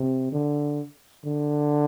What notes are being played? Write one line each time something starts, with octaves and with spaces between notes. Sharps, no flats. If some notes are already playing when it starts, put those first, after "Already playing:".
Already playing: C3
D3
D3